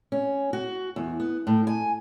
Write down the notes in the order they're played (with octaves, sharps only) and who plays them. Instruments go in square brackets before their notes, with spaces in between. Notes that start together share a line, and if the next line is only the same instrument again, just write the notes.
[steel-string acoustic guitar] C#4
F#4
E2
B3
A2
G#5